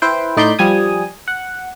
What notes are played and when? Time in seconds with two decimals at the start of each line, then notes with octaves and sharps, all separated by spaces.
0.02 E4 B4 C5 G5
0.37 A2 D#4 D5 B5 C6 G6
0.59 F3 G3 G#5 D#6
1.28 F#5